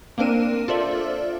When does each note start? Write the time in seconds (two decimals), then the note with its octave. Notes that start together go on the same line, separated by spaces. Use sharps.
0.18 A#3 C4 D4 A#4 D#7 E7
0.68 F4 A4 C5 D5 E5